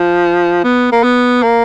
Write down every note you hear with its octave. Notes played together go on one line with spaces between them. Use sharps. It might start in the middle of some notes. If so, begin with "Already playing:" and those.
Already playing: F3
B3
A#3
B3
A#3